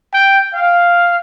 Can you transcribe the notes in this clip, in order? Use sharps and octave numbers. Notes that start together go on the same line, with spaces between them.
G5
F5